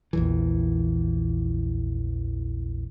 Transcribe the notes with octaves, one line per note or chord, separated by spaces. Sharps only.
A#1 E2 E3